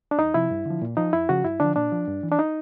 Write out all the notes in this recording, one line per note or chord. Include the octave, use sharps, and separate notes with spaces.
D4
E2 D#4
C3 F3 E4
G2
D3 F3
A#2
F3 D#4
F2 E4
C#3 F3 F#4
G2 E4
D3 F3 D4
A#2 D4
F3
G2
E3
D4
D#4